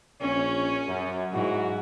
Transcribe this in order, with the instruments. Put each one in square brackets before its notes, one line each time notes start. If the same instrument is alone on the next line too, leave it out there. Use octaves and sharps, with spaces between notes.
[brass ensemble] A#1 C#5 [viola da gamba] C#4
[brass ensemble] F#2
[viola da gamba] G#2 [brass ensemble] F#3 E4 F#4